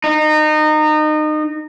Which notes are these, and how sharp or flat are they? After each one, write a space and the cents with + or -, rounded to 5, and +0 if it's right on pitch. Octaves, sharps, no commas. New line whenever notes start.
D#4 -25